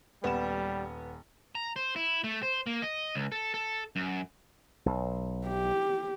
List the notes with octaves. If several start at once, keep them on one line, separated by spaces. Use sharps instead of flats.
D#1 G3 B3 B5 E7
A#5
C5
E4
A3
C5
A#3
D#5
C#2
A4
A4
F#2
B1
G4